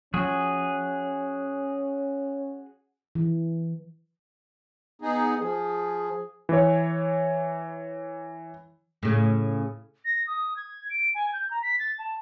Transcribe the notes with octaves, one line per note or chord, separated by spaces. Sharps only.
F3 C#4 F#4 G#4
E3
B3 D#4 G#4
F3 G#4
E3 C#5
A2 C#3
A#6
D#6
G#6
D7
G#5
G6
A#5
B6
A6
A5